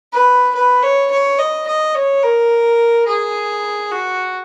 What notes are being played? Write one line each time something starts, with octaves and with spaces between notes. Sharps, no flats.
B4
B4
C#5
C#5
D#5
D#5
C#5
A#4
G#4
F#4